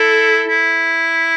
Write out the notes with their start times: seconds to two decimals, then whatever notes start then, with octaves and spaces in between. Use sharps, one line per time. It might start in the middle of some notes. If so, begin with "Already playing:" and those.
Already playing: E4 A4
0.48 E4